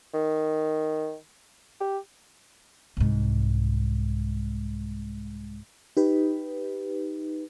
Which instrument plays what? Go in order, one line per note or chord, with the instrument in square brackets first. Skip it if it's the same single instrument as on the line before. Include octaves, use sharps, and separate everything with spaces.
[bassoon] D#3
G4
[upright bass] C2 G#2
[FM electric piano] D#4 G4 B4